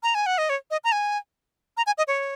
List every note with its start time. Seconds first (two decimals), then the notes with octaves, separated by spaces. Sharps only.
0.03 A#5
0.15 G#5
0.26 F#5
0.38 D#5
0.50 C#5
0.71 D#5
0.84 A#5
0.92 G#5
1.77 A#5
1.86 G#5
1.98 D#5
2.08 C#5